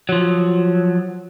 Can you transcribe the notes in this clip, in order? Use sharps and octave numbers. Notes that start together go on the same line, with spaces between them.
F3 F#3